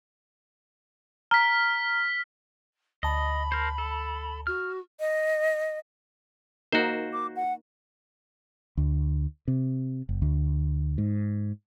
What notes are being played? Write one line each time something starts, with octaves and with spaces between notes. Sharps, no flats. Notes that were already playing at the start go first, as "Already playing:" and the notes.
A#5 F6 B6
D2 D#5 A5 B5
A#4 C5
A4
F#4 F6
D#5
A#3 D#4 F#4 A#4 C5
D6
F#5
D2
C3
F#1
D2
G#2